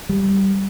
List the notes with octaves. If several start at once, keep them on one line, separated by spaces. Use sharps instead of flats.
G3